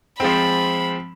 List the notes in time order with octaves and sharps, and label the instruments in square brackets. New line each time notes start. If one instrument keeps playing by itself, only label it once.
[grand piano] F3 G#3 C4 [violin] B5